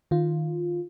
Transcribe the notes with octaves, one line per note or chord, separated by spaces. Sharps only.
D#3 F4